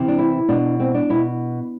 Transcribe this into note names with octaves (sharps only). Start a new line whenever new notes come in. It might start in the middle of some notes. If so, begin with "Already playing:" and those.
Already playing: C3 E3
D4
E4
B2 D4
C4
D4
B2 E4